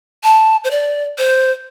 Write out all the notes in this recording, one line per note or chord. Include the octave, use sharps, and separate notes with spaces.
A5
C5
D5
C5